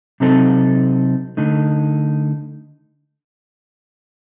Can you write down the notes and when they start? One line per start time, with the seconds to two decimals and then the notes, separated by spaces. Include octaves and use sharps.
0.20 C3 F#3 C4 D#4 A4
1.37 D3 A3 D#4